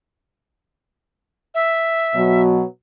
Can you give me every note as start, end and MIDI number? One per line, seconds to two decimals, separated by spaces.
1.55 2.42 76
2.13 2.61 47
2.13 2.61 54